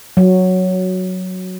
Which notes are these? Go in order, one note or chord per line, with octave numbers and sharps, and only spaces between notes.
F#3